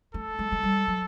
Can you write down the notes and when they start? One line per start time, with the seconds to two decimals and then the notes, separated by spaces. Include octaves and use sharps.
0.14 A3 A4
0.39 G#3
0.52 G#3
0.63 G3
0.88 F#3